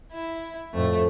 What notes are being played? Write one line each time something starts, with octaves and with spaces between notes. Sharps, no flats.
E4
F2 A2 A3